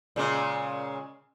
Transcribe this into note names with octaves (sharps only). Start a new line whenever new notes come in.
A#2 C#3 G#3